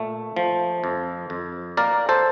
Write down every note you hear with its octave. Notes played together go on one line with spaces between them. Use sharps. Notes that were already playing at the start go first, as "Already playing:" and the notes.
Already playing: A#2 A3
F3
F2
F2
A#3 A#4 D5
A4 C5